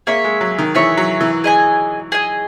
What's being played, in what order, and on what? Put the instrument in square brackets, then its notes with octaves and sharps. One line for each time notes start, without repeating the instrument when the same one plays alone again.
[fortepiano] A#3 [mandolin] G#4 C#5 E5
[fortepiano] G#3
F#3
D#3
[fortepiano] E3 [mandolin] G#4 C#5 E5
[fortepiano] F#3
E3
[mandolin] G#4 D#5 G#5
G#4 D#5 G#5